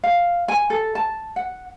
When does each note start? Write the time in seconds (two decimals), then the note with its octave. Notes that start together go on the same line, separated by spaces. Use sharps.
0.04 F5
0.48 G#5
0.70 A4
0.95 A5
1.36 F#5